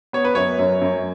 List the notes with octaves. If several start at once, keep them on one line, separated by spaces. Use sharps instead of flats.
B3 C#5
B4
F#2 C#5
F#2
F#2